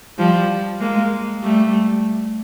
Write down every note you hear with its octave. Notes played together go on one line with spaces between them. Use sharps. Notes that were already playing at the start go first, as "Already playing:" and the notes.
F3 G3
G#3 A#3
G3 A3